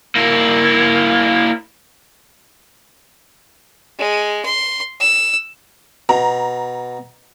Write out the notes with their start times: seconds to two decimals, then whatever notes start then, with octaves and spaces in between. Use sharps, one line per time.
0.15 A#3 E4
3.99 G#3
4.45 C6
5.00 E6
6.09 B2 A#5